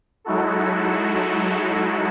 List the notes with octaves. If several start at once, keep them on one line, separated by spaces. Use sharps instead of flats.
F#3 G#3 D#4 E4 F#4 A4